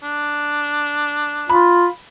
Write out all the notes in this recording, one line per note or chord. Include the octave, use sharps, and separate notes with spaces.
D4
F4 B5